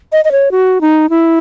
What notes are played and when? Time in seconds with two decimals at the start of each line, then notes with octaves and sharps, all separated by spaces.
0.12 D#5
0.25 D#5
0.32 C#5
0.51 F#4
0.81 D#4
1.10 E4